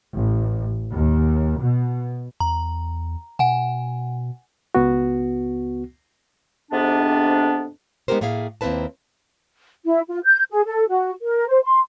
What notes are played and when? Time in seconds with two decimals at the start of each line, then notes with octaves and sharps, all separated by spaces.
0.14 A1
0.92 D#2
1.61 B2
2.40 E2 A#5
3.39 B2 F#5 G#5
4.75 C#2 B3 F#4
6.71 F2 G#2 C3 B3 D4
8.08 G#3 B3 D#4 G4 A#4 C5
8.21 A2 A#3 G#4 E5 F5
8.61 D#2 A#3 C4 E4 B4 A5
9.85 E4
10.09 F4
10.24 G6
10.51 G#4
10.65 A4
10.90 F#4
11.22 A#4
11.49 C5
11.64 C6